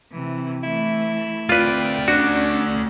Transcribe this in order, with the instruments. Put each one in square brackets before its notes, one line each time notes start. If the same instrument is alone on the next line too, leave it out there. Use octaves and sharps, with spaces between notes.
[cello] C3 E3
[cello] E3 A3 [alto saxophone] E4
[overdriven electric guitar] A3 D5 [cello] C4 G5 [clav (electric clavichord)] F4 B4
[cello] C#4 [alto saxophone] D4 [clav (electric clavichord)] F#4